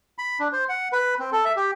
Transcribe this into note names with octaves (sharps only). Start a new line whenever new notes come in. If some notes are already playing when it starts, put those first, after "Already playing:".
B5
D4
C5
F#5
B4
C4
A4
E5
G4